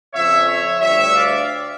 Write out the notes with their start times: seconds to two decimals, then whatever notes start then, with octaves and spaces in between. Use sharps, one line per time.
0.14 F2 C#3 F3 C#5 E5
0.48 C#5 E5
0.81 D2 D3 G3 C#5 E5
1.15 D5 F5